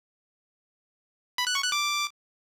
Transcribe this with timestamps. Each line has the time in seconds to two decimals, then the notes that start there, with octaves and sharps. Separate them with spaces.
1.38 B5
1.47 F#6
1.55 C#6
1.64 F#6
1.72 D6